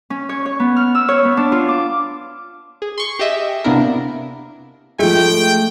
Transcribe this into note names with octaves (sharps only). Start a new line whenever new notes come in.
C#4
C#5
C#5
B3
F6
E6
C#5
B3
D4
F4
D6
G#4
C6 C#6
G4 G#4 D#5 E5
C3 A#3 B3 D4 E4 A#4
F3 G#3 A3 G5